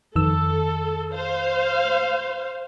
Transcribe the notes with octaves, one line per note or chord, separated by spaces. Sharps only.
F2 D#3 A4 E6
C5 F5